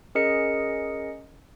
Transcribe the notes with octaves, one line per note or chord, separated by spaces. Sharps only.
C#4 G#4 A#4 D#5 C#7